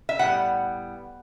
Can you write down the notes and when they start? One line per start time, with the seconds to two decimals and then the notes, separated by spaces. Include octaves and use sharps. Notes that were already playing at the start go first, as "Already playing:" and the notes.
0.09 E5
0.19 A2 G3 B3 F#5